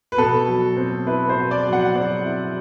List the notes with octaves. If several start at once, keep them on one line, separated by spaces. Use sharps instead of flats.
B4
B2 A4
F#3
C4
E4 B4
C5
B2
D5
F#3
F#5
C4 D5
E4